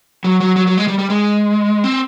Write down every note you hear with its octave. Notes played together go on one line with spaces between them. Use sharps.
F#3
F#3
F#3
F#3
G#3
G3
G3
G#3
C4